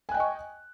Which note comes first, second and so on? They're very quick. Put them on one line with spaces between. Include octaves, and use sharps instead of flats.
G#5 F#6 G5 D#5 C#6